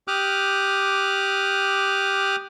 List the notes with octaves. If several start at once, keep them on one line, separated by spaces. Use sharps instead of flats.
G4 D6 D#6 F6 F#6